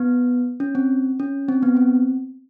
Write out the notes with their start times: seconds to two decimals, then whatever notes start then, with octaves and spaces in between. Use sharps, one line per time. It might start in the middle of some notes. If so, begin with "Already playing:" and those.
Already playing: B3
0.60 C#4
0.75 C4
1.20 C#4
1.49 C4
1.63 B3
1.77 C4